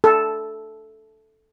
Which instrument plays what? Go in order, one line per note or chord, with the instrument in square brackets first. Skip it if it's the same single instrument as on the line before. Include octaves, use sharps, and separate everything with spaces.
[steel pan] A4